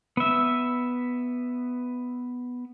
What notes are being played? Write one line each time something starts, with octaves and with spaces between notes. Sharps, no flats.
B3 E5